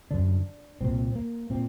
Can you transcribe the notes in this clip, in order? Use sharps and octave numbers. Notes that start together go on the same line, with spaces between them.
F#2 D3 D4
C2 A#2 C4
A#3
A#2 C4